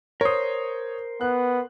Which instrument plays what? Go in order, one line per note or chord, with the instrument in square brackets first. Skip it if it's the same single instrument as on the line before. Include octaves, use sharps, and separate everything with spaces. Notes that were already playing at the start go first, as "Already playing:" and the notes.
[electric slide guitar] A#4 C5 [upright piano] C#5 D#6
[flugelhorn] B3 [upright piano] F#6